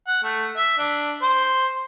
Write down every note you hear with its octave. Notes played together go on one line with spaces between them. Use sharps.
F#5
A3
E5
D4
C5